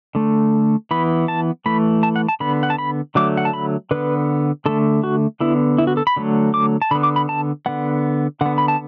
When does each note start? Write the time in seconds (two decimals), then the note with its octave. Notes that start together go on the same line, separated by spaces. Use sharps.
0.15 D3 A3
0.91 E3 B3 B5
1.28 A5
1.66 E3 A3 B5
2.03 A5
2.16 F#5
2.29 A5
2.40 D3 B3 B5
2.63 F#5
2.70 A5
2.78 B5
3.15 D3 F#3 A3 D6
3.37 F#5
3.45 A5
3.53 B5
3.91 D3 B3 B4
4.66 D3 A3 A4
5.04 F#4
5.40 D3 B3 E4
5.78 E4
5.87 F#4
5.97 A4
6.07 B5
6.16 D3 F#3 A3
6.54 D6
6.82 A5
6.91 D3 B5
6.95 B3
7.03 D6
7.16 B5
7.29 A5
7.66 D3 B3 F#5
8.41 D3 B3 F#5
8.58 B5
8.68 A5